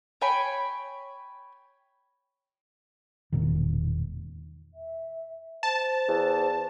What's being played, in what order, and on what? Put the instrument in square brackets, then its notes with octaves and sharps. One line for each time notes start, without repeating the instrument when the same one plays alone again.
[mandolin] C#5 G5 G#5 B5
[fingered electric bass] E1 A#2 D#3
[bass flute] E5
[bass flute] C5 [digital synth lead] A5
[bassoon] E2